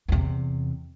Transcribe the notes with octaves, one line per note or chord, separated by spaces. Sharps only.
E2 C3